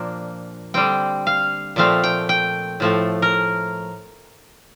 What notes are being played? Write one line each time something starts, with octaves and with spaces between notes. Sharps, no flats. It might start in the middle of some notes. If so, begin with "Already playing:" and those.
Already playing: A#2 F3 A#3 D4
D3 G3 C4 G5
F5
A#2 F3 A3 C4 F5
G5
G5
A2 F3 A3
A#4